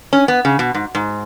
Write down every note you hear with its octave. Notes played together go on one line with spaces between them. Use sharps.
C#4
B3
C#3
B2
G#2
G#2